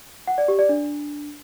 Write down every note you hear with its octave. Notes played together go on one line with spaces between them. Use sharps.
F#5
D5
G4
D5
D4